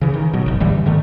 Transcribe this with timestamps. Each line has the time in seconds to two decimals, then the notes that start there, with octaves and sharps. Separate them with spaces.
0.01 C#3 E3
0.14 D#3
0.33 B2 F#3
0.46 F#1 B1
0.60 G2 D3 E3 G3
0.86 G#2 D3 D#3 A3